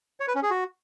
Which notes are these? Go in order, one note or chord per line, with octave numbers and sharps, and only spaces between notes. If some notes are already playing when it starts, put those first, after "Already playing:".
C#5
B4
C#4
G#4
F#4